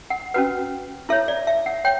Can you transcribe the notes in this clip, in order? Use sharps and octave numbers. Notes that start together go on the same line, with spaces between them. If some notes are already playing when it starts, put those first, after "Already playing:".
F#5
C#4 F#4 B4 F#5
E4 A4 C#5 E5
D5
E5
F#5
C#5 G5